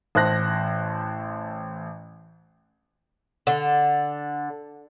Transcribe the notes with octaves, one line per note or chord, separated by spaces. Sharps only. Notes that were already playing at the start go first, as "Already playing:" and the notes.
A1 C5 A5 F#6 A#6
D3